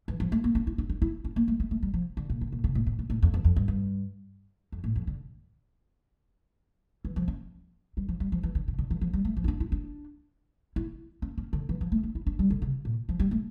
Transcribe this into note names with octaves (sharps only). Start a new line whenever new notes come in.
E3
F3
A3
A#3
C#4
E4
D4
D4
E4
C#4
A#3
A3
A3
A3
G3
F3
D3
A#2
C#3
A#2
C#3
A2
A#2
A2
A2
F2
E2
F2
G2
G2
F2
A2
F2
D3
E3
F3
C#4
G3
F3
G3
F3
E3
D3
C#3
D3
E3
F3
G3
A3
F3
E4
D4
E4
D4
E4
C#4
C#4
D3
E3
F3
A3
D4
E4
D4
G3
D3
C#3
A#2
F3
G3
A3